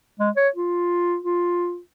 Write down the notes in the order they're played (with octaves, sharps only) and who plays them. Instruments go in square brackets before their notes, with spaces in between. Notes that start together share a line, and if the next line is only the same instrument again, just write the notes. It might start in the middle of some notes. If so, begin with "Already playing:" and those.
[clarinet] G#3
C#5
F4
F4